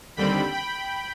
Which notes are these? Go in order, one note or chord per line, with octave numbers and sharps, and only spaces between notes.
D#2 D3 G3 C4 G5 B5
G5 B5